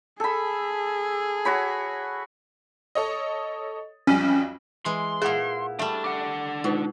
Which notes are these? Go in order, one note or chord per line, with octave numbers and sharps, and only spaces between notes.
G#4 A4 B5
F#4 C#5 B5
A4 C#5 D#5
B1 F2 G3 C#4
E3 G#3 C6
A#2 E4 G#4 F#5
G3 A3 D4 E5 A5
D4 F#5 D6
B2 G#3 D#4 F4